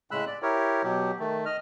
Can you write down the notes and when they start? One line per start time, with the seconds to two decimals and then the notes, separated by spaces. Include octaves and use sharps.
0.11 A2 C#3 G#3 B5 E6 F#6
0.27 D5
0.42 E4 G4 A#4 C#5
0.84 B2 F#3 G4
1.20 D#3 A3
1.46 D#5 F6